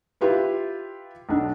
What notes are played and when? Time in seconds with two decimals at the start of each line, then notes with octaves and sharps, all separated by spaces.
0.21 E4 F4 G4 B4
1.29 B1 D4